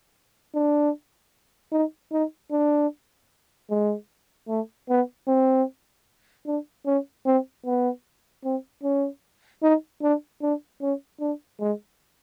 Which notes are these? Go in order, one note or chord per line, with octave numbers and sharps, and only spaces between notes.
D4
D#4
D#4
D4
G#3
A3
B3
C4
D4
C#4
C4
B3
C4
C#4
D#4
D4
D4
C#4
D4
G#3